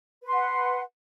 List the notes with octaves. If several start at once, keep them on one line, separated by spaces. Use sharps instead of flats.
B4 F#5 C6